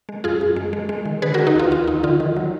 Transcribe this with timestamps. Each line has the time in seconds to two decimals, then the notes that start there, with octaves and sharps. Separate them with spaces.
0.09 G#3
0.24 F#2 F4 G#4
0.41 F#2
0.56 G#3
0.73 G#3
0.89 G#3
1.06 D#3
1.22 D3 G#4 B4
1.34 F#4 A#4
1.39 D3
1.47 D#4 F#4
1.55 D#2 F4
1.71 D#2 F4
1.87 D#2 D#4
2.03 D3 F4
2.20 D#3
2.36 F#3